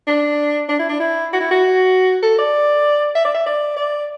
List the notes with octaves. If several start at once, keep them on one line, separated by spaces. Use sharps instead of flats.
D4
D4
E4
D4
E4
F#4
E4
F#4
A4
D5
E5
D5
E5
D5
D5